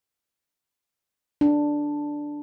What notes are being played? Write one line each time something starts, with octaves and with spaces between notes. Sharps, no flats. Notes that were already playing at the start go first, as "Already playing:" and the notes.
D4